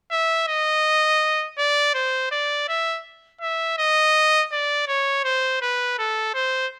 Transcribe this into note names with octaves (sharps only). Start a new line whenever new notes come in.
E5
D#5
D5
C5
D5
E5
E5
D#5
D5
C#5
C5
B4
A4
C5